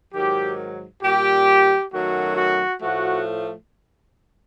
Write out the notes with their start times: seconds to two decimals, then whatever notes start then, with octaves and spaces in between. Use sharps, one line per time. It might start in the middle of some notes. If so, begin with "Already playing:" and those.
0.13 G#2 D#3 F#3 G4
1.03 A#2 G3 G4
1.92 F#2 D#3 F#3 A3 F#4
2.37 F#4
2.82 A2 F3 A3 F#4